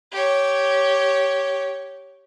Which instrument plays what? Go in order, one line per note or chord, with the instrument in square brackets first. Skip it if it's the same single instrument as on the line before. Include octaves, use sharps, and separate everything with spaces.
[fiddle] G4 C#5